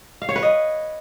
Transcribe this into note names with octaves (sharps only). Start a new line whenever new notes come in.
F5
C#5
B4
D#5